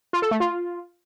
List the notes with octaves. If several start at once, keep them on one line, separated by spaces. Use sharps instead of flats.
F4
A4
A3
F4